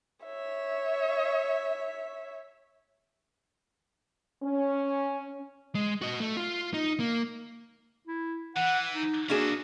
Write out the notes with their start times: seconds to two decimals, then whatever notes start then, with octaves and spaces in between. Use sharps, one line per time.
0.25 C#5 E5
4.43 C#4
5.75 G#3
6.02 F#4 D#5
6.20 A3
6.37 F4
6.74 D#4
7.00 A#3
8.07 E4
8.56 E3 F#5
8.93 D#4
9.29 A#3 C#4 D4 F#4 G#4 E5